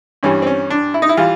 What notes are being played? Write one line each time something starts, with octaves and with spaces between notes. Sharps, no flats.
G2 E3 G3 C#4
C4
C#4
D4
E4
D#4
E4
E3 G3 F4